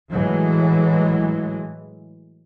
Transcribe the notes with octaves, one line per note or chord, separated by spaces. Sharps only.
A2 E3 F#3 G#3